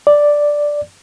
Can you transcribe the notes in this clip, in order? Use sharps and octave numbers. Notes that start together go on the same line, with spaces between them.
D5